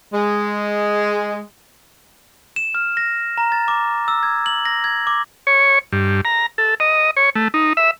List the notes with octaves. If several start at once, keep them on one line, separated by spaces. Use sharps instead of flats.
G#3
E7
F6
A#6
A#5
A6
D6
E6
G#6
F#7
A#6
G#6
D6
C#5
G2
A#5
A4
D#5
C#5
A3
D#4
E5